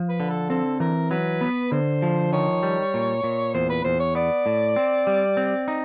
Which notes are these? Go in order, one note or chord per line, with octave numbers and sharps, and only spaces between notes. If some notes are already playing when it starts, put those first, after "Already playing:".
Already playing: F3
B4
D3
A4
C4 A4
E3 A#4
F#3 B4
B3
D3 C5
F3
D#3 C#5
G3
A#2
A#2
E2 C5
B4
E2 C5
C#5
B3 D5
A2
C4
G3
C4
D#4